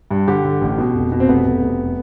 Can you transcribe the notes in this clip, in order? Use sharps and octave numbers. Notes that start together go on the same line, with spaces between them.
G2
D3 G4
D3
A1
B2
F1
B2
C4
F1 B3
F1
F1